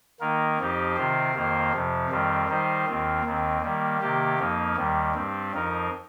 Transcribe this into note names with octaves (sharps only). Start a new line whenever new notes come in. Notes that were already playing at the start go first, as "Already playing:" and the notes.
D#3 A#3 D#4 A#4
F2 F3 C4 D#4 G4
C3 D#3 C4 F4 C5
F2 D#3 A#3 F4 C5
F2 C3 F3
F2 D#3 G3 C4 F4
D#3 G3 D#4 C5
D#2 D#3 C4 F4
D#2 D#3 C4
D#3 G3 A#3
C3 D#3 A#3 G4
F2 F3 A#3 D#4
D#2 D#3 G3
G2 G3 C4
F2 F3 D#4 A#4